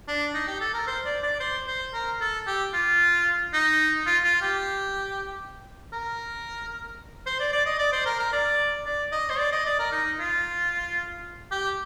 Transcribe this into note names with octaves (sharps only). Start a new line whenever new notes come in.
D4
D#4
G4
A4
A#4
C5
D5
D5
C5
C5
A#4
A4
G4
F4
D#4
F4
F4
G4
A#4
C5
D5
D5
D#5
D5
C5
A#4
A#4
D5
D5
D#5
C5
D5
D#5
D5
A#4
D#4
F4
G4